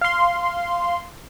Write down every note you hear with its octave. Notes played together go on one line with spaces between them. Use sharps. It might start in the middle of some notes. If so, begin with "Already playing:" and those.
F5 C6